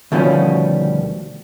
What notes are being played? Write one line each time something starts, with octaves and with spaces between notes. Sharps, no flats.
D2 B2 D#3 F3 G3 C#4